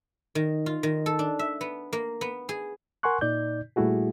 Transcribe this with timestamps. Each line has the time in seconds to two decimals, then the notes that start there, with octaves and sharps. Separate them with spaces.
0.35 D#3
0.66 F4
0.83 D#3
1.06 A4
1.19 D4
1.39 E5
1.61 B3
1.93 A#3
2.21 B3
2.49 G#4
3.03 A#4 F#5 G#5 C6 C#6 F#6
3.21 A#2 D#4 D5 G6
3.76 A#2 G3 A3 E4 F#4 G#4